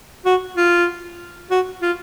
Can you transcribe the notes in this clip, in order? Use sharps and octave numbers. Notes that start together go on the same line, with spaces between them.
F#4
F4
F#4
F4